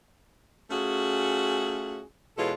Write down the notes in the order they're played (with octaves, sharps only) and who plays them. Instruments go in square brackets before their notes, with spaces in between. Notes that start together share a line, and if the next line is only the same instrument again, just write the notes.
[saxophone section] A3 C#4 F4 F#4 G#4
B2 E3 G#3 F4 A4 C#5